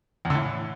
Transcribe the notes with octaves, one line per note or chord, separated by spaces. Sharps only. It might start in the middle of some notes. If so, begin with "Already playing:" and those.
E2
D3
A2